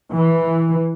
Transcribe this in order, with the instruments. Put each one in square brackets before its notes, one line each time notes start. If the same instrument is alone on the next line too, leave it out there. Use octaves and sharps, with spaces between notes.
[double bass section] E3